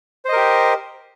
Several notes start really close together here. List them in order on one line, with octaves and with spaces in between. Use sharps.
C5 D#5 A#4 G4